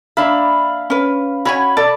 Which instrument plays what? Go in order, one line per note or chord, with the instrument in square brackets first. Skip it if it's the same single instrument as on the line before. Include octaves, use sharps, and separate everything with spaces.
[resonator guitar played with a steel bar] A#3 D4 E5 [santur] F5 B5
[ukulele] C#4 B4
[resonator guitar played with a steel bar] C#4 C#5 G#5 [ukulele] F#4 [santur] B5
[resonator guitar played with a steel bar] B2 [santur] A4 [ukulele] D5